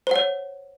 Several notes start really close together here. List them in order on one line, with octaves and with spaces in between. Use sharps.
C5 F#5 C#5